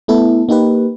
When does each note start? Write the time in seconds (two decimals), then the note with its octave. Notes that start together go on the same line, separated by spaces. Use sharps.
0.08 A3 B3 E4 A4
0.49 A#3 D#4 G4 B4